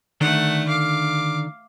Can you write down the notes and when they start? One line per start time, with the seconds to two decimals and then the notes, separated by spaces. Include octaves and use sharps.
0.21 D3 D#3 A3 D4 F#5
0.68 F5 D6